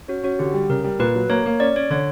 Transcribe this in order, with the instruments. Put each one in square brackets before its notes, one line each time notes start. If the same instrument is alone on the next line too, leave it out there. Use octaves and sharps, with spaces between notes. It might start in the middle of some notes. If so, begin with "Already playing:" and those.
[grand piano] C#4 [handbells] F#4
[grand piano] C#4 [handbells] F#4
[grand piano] D3 [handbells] G4
[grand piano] G3
[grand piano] C#3 [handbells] A#4
[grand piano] G3
[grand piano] A#2 [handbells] B4
[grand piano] F#3
[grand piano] A#3 [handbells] C#5
[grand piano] A#3
[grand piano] C#4 [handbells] D5
[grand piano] C#4 [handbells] C#5
[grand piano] D3 [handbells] C#5